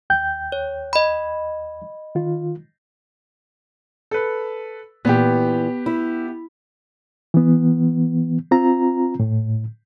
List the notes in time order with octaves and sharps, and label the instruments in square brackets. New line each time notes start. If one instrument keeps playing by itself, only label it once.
[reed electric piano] D#2 G5 G6
[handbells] C#5
D#5 B5
[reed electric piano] D#3 F4
[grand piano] A4 B4
[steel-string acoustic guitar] A#2 E3 [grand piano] B3 G4
[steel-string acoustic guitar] E4
[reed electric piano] E3 B3
C4 F4 A#5
A2